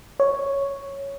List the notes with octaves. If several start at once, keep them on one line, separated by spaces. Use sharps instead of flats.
C#5